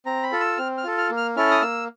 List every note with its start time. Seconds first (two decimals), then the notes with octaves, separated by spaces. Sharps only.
0.06 C4 A#5
0.23 B5
0.32 F4 A4
0.40 E6
0.58 C4 F6
0.78 F6
0.84 F4 A4
0.98 F6
1.10 A#3
1.17 F6
1.36 C#4 E4 A4 F6
1.51 D#6
1.62 A#3 E6